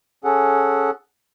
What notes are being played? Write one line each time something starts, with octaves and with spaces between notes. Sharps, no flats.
C#4 G#4 A4 F#5